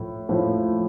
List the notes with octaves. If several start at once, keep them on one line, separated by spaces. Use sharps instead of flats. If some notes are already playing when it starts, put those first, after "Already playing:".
Already playing: A2 F3
A2 F3